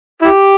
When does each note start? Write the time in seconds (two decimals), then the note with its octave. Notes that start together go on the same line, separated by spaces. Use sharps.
0.22 E4 G4